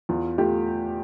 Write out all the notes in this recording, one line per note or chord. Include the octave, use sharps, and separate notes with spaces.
E2 F4
A3 F4 G4